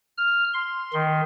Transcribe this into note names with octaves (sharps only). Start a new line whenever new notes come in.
F6
C6
D#3